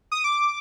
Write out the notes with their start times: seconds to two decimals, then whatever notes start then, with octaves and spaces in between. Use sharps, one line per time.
0.12 D#6
0.24 D6